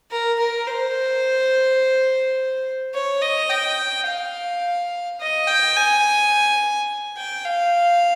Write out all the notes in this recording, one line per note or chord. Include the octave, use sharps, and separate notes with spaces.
A#4
A#4
C5
C#5
D#5
G5
F5
D#5
G5
G#5
G5
F5